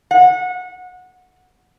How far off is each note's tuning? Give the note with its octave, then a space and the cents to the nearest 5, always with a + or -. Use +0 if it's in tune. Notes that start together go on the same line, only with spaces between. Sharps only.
F#5 -25